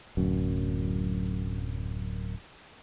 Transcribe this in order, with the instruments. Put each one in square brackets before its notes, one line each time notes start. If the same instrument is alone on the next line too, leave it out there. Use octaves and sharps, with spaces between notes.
[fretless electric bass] D1 F#2